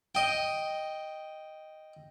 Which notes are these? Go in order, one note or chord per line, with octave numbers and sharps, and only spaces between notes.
D#5 G5